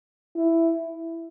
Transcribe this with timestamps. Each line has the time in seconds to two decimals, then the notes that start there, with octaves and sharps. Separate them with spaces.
0.36 E4